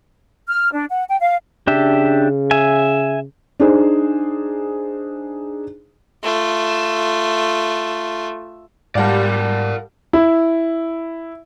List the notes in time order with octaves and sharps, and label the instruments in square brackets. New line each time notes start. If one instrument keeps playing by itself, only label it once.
[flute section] F6
D4
F#5
G5
F5
[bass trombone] C#3 [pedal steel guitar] D4 G4 E5
[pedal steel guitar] E5 G#5
[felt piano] D4 D#4 G#4 C5
[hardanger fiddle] A3 F4
[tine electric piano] G#2 [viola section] G3 [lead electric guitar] A#4 D5 [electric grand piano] F5 F#5 A5
[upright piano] E4